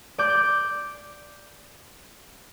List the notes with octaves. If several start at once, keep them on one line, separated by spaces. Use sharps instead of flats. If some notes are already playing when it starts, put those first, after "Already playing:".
D5 D6 G6